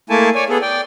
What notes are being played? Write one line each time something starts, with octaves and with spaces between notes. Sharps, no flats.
A3 A#3 E4 G#5 A5
C#5 D5 G#5
B3 G#4 A4
D5 G5